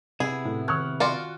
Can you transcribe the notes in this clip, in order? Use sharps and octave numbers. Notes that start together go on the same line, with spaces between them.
C3 B3 E4 G#4
A2
D#3 C#6 F6 F#6 G#6
F4 F#4 D5 G#5 C6